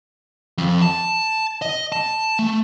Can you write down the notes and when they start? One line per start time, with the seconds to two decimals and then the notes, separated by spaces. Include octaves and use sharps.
0.58 F2
0.82 A5
1.62 D#5
1.92 A5
2.39 A3